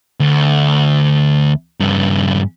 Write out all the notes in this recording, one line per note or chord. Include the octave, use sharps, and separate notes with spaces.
D2
G2 C#3